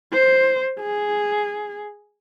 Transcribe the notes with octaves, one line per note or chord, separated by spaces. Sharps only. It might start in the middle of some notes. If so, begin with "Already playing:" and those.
C5
G#4